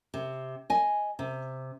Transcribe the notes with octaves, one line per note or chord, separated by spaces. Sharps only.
C3
D#5 G#5
C3